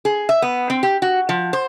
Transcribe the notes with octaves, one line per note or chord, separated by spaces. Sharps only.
G#4
E5
B3
C4
G4
F#4
F3
C5